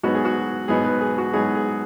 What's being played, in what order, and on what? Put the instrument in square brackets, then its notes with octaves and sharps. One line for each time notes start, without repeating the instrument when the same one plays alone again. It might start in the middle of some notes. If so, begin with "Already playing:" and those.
[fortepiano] G#2 F#3 B3 D#4 F#4
G#4
F#4
G#2 F#3 B3 D#4 G#4
B4
G#4
F#4
G#2 F#3 B3 D#4 G#4
G#4